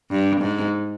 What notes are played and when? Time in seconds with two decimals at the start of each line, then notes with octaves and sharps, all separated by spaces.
0.11 G2
0.41 G#2